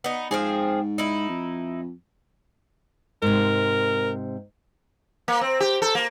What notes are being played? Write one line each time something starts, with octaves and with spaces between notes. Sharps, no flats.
B3 D#4
G#2 F3 C4 G#4
D#4 E4
F2
G#2 C3 A#4
A#3
C4
G4
A4
A#3